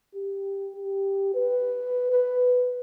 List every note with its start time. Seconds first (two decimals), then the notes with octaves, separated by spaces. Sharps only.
0.15 G4
0.77 G4
1.35 B4
2.13 B4